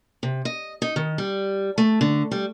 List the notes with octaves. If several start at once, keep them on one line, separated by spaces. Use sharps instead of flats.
C3
D#5
D#4
D#3
G3
A3
D3
G3